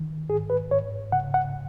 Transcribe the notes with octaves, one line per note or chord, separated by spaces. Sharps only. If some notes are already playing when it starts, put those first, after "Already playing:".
Already playing: D#3
G#2 G#4
B4
G#2 C#5
C#3 F#5
F#5